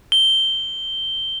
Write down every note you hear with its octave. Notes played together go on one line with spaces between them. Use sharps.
G7